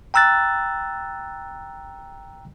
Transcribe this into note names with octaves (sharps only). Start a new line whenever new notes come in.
G5 A#5 E6 F#6 A6